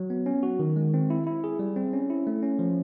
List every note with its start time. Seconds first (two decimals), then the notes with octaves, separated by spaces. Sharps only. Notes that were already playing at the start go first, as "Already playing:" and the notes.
Already playing: F#3
0.10 B3
0.26 C#4
0.43 F#4
0.59 D#3
0.76 G#3
0.94 C4
1.10 E4
1.27 E4
1.44 G#4
1.59 G3
1.76 C4
1.93 C#4
2.10 E4
2.27 A3
2.43 C#4
2.59 F3